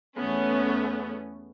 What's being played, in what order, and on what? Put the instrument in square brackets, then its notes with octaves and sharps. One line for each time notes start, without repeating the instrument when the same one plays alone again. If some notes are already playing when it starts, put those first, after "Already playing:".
[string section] E2 A3 B3 C#4